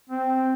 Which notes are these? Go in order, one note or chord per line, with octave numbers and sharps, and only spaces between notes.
C4